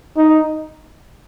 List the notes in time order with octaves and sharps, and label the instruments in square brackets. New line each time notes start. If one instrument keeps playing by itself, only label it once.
[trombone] D#4